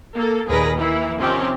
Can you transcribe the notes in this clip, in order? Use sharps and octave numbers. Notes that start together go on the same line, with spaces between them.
A#3 A4
D#2 A#2 G#4 A#4 B4 A#6
E3 A#3 E4
C3 D#3 F3 C4 C#4 G4